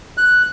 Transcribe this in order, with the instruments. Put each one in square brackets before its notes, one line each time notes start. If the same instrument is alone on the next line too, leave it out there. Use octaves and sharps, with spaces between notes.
[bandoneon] F#6